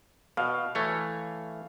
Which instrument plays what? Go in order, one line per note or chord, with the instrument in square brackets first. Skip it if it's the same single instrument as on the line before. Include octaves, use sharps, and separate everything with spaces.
[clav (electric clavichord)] B2 [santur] F5
[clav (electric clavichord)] E3 A3 C#5